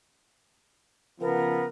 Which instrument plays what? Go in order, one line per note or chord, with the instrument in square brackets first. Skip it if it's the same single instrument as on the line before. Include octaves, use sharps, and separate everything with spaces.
[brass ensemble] C#3 F3 B3 [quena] A#4